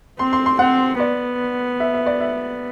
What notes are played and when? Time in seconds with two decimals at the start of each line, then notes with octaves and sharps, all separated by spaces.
0.19 C4 C6
0.33 C6
0.46 C6
0.59 C4 F#5
1.00 B3 D5
1.80 E5
1.94 E5
2.06 D5
2.20 E5